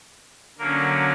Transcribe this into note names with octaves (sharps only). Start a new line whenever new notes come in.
D3 F#3 A#3 C#4 A#4